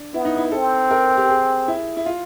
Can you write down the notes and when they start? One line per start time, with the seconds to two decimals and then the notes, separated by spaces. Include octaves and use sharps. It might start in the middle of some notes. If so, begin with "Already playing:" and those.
Already playing: D4
0.14 B3 E4
0.25 D#4
0.37 E4
0.52 C4 A4
0.91 A#4
1.17 G4
1.29 G#4
1.68 E4
1.97 E4
2.06 F4